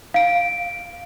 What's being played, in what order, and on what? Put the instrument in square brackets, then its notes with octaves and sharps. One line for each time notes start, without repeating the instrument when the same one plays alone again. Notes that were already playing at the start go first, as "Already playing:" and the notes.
[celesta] F5 D7